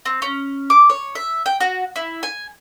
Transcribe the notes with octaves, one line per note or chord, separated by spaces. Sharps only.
C4
C#4
D6
C#5
E5
G5
F#4
E4
G#5